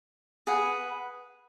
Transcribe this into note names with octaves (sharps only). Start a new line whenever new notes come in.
G#4 B4 F#5